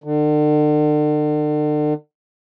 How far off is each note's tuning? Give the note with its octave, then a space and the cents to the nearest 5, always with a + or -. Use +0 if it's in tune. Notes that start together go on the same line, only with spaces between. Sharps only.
D3 +40